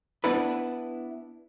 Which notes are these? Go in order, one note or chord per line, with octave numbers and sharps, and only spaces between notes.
B3 D4 E4 B4